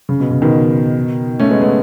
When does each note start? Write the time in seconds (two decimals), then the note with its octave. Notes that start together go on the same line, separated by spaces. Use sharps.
0.09 C#3
0.20 B2
0.31 C#3
0.42 B2 D#3
1.40 A3 C#4
1.51 G#3 B3
1.61 G#3 B3